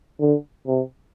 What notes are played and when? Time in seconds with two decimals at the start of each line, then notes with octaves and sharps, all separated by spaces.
0.20 D3
0.67 C3